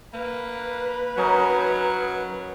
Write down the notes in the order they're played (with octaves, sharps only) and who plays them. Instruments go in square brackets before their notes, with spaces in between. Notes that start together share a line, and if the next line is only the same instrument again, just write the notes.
[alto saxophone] A#3 [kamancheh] B4
[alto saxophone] F#3 [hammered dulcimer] C#4 D#4 A#4